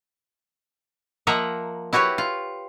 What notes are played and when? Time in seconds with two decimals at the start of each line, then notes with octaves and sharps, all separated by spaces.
1.27 F3 A#3 D#5 E5 F#5 A#5
1.93 E4 F#4 G4 B4 C#5
2.18 F4